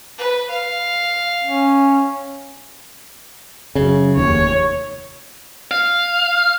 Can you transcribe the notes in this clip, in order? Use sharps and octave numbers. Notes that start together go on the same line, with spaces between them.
B4
F5
C#4
F#2 C#3
F1 D#2 C#5
F5